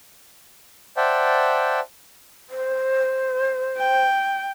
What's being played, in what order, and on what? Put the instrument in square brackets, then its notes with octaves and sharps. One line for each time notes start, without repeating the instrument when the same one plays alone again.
[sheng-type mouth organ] C5 D5 E5 F#5 G5 A5
[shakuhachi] C5
[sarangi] G5